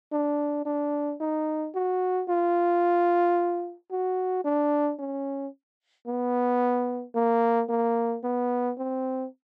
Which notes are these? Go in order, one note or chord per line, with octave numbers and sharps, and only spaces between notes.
D4
D4
D#4
F#4
F4
F#4
D4
C#4
B3
A#3
A#3
B3
C4